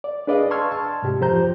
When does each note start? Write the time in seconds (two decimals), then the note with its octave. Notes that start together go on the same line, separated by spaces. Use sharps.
0.04 D5
0.27 D4 G#4 B4 D5 D#5 F5
0.51 A5 C6 C#6 E6 F6 G#6
0.72 A5
1.02 G#2 C3 G4
1.21 F2 F3 G4 C5 A#5 G6